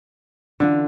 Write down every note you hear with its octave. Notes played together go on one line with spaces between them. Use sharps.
D3 E3 D4 F4